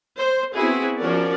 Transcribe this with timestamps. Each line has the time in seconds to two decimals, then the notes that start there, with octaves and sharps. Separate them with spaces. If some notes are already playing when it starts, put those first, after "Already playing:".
0.17 C5
0.55 B3 C4 E4 F#4 G#4
0.97 F3 C#4 F#4 A#4 D5